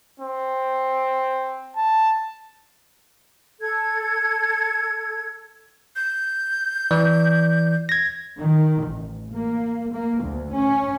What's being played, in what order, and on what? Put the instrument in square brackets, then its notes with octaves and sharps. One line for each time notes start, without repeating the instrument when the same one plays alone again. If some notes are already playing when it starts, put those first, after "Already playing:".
[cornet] C4
A5
[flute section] A4 G#6
[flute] G6
[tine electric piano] E3 D5
G#6 A#6
[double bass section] D#3
A1
A#3
A#3
D2
C#4